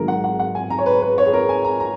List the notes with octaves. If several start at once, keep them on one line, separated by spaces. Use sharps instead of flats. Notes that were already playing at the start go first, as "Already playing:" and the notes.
Already playing: G#1 G#2 D#3 F#3 G#4 A#4
F#5
F#5
F#5
G#5
A#5
C#5
B4
B4
C#5
G#4
A#4
G#5
A#5
A#5